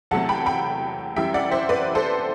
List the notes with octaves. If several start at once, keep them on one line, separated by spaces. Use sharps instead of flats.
E2 C3 F#3 A3 F#5 A5
G5 B5
G5 B5
F#2 E3 G3 E5 G5
D5 F#5
C5 E5
B4 D5
A4 C5